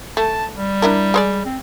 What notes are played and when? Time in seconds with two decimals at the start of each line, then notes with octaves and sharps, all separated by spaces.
0.17 A3 A5
0.57 G3
0.82 D4 E4 A#4
1.14 G#3 C5 D5
1.45 C4